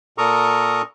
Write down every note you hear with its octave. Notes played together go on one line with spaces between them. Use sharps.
A#2 A4 A#4 A#5 C#6 D#6